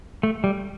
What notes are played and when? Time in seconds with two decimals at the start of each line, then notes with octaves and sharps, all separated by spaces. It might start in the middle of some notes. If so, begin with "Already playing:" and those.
0.23 A3
0.44 G3